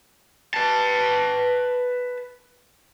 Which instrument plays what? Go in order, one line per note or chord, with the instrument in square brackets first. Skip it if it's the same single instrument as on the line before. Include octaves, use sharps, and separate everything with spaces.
[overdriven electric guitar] B4 A5